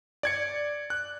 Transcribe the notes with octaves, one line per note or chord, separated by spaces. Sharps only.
D5 G#6 C#7
F#6